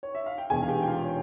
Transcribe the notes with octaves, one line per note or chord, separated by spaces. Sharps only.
C#5
E5
F5
G5
E1 E2 E3 G#3 G#4 G#5
F5
G4 G5
G5
F4 F5
C#5